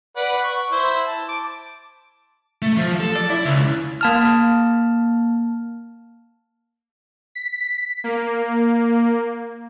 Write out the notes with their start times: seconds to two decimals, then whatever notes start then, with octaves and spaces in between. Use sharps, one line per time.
0.16 B4 D5 F#5
0.44 C#6
0.71 E4 C5
1.07 A5
1.29 D6
2.62 A3
2.77 F3
3.00 A4
3.16 D5
3.30 E4
3.45 C#2
4.01 A#3 A5 F6
7.35 B6
8.04 A#3